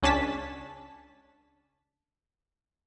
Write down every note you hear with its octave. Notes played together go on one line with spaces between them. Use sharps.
C#2 C#4 D4 A5 B6